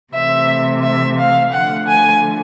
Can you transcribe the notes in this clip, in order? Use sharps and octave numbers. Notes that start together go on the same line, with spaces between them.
C3 E3 A3 E5
E5
F5
D3 F3 A3 F#5
G#5